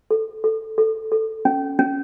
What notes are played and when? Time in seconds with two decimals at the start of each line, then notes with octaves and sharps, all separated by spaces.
0.11 A4
0.44 A4
0.78 A4
1.12 A4
1.45 C#4
1.79 C#4